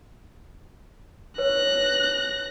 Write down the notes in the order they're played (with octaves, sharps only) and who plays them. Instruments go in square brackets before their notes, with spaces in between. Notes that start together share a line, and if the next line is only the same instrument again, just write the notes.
[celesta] B4 C#5 [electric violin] F#6 A#6